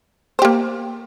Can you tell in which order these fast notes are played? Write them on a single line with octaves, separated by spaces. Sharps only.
C5 G4 A#3